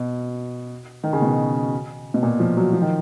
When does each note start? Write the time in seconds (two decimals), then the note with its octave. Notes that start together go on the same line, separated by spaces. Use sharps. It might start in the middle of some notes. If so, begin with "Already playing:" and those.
Already playing: B2
1.04 D#3
1.13 C#3
1.22 B2
2.14 B2
2.23 A#2
2.40 F3
2.57 F#3
2.73 F3
2.82 D#3